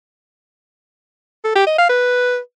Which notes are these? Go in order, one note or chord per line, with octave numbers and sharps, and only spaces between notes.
A4
G4
D#5
F5
B4